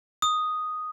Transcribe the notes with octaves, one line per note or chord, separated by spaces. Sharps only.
D#6